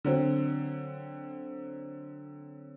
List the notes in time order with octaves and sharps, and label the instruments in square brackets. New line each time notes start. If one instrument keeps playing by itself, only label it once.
[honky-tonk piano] D3 F#3 C4